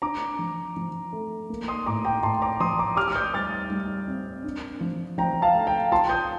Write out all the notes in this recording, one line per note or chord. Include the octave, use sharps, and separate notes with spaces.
D4 A#5 D6
F3
F3
A3
A#3
C6 D#6
A2 A#5 D6
G5 A#5
A2 A5 C6
A#5 D6
F3 C6 D#6
A#5 D6
G4 D6 F6
F6
D#6 G6
G3 F6 A6
G3
C4
D4
F3
F3 G5 A#5
F5 A5
A3
G5 A#5
F4 A5 C6
D#6 G6